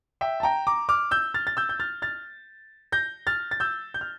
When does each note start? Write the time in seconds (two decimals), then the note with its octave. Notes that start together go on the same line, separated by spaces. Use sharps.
0.21 E5 G5
0.40 A5
0.43 G5 A#5
0.67 A#5 D6
0.89 D6 F6
1.11 E6 G6
1.34 F6 A6
1.47 A6
1.57 E6 G6
1.69 G6
1.80 F6 A6
2.02 F6 A6
2.92 G6 A#6
3.27 F6 A6
3.51 A6
3.60 E6 G6
3.94 G6
4.01 F6